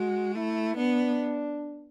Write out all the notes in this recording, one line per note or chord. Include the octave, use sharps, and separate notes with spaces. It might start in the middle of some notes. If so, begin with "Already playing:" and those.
Already playing: G#3 F#4
A3 E4
B3 D4